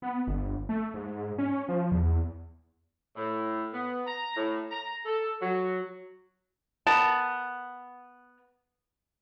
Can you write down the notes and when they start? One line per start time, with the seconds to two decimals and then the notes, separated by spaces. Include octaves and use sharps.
0.02 B3
0.27 G1
0.69 A3
0.94 G#2
1.38 C#4
1.69 F3
1.92 E2
3.16 A2
3.73 B3
4.07 A#5
4.36 A2
4.71 A#5
5.06 A4
5.42 F#3
6.87 B3 A#4 A5